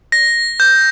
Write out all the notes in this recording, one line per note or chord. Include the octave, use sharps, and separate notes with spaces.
A#6
G6